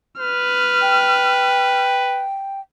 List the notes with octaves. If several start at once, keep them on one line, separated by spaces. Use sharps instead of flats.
B4 F6
G5